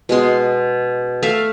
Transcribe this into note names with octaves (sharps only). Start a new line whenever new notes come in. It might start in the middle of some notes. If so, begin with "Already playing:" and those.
B2 G#3 C6
A3 E5 F5